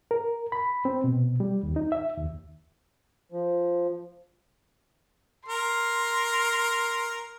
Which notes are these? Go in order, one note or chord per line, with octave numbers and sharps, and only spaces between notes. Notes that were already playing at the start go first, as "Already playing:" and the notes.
A#4
B5
C4
B2
G3
D#2
D#4
E5
D#2
F3
A#4 C6